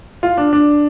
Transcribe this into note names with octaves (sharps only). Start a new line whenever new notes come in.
F4
D4
D4